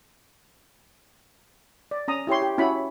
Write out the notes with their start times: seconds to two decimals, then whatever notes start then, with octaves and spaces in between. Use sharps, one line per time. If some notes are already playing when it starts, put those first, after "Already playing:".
1.91 D5
2.08 C#4 A#5 D#6
2.27 E4 G4 C#5 C6
2.42 G4
2.58 C#4 E4 F#4 B5